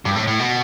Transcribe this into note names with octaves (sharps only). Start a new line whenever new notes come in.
G2
A2
A2
B2